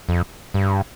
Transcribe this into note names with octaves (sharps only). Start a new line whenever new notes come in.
F2
G2